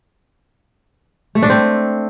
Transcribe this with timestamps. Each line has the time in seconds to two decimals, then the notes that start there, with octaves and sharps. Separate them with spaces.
1.35 A3
1.42 D4
1.50 C4